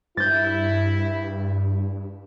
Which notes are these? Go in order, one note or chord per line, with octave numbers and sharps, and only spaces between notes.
G2 E4 G6 A6